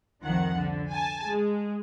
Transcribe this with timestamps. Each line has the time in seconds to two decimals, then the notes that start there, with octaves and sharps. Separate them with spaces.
0.24 C2 F2 D#3 F3 F#5
0.58 D3
0.90 G#5 A5
1.27 G#3